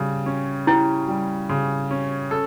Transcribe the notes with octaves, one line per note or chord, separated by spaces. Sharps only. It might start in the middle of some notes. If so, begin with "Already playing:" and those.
Already playing: C#3 G3
C#4
E4 G4
G3
C#3
C#4
A4